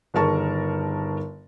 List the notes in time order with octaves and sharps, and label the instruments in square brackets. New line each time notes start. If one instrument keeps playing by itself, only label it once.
[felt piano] G1 D#3 G#4 A#4 A5 C#6